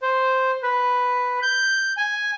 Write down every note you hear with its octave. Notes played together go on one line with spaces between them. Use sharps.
C5
B4
G6
G#5